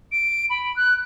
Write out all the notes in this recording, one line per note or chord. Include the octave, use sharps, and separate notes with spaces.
D7
B5
F#6